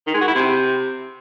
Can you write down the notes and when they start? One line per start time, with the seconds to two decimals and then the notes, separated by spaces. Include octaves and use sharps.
0.07 D#3
0.14 G#3
0.21 F#4
0.28 E4
0.35 C3